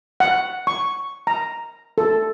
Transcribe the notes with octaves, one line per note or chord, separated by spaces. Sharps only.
F#5
C#6
A#5
A4